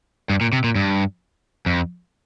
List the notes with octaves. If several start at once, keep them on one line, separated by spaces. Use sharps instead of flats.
G2
A#2
C3
A#2
G2
F2